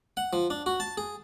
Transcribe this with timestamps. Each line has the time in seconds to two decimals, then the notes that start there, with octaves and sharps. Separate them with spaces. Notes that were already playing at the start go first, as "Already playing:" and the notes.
0.17 F#5
0.33 F3
0.50 D4
0.66 F#4
0.80 A5
0.98 G#4